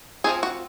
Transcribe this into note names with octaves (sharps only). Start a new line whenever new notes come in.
F3 G#3 C4 G#4
F#4